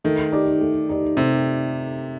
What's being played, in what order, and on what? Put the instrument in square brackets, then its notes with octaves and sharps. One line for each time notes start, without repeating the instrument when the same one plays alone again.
[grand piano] D#3 [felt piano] A3
[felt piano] D#4 G4 D5
A3
D#4 G4 D5
[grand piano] C3 [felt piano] A3